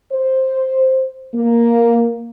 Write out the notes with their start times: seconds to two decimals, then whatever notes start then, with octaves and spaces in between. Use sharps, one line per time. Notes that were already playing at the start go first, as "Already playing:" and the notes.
0.12 C5
1.35 A#3